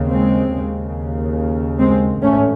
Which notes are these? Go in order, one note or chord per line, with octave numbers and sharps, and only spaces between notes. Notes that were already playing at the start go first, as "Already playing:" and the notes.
Already playing: D#2 C#3
G#3 C4
D#2 C#3
G#3 C4
A1 G#2 A3 C#4